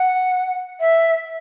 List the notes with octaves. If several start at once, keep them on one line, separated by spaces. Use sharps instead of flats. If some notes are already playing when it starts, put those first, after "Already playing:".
Already playing: F#5
E5